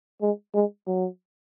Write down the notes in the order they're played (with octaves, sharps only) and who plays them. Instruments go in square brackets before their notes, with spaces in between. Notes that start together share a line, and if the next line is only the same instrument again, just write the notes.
[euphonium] G#3
G#3
F#3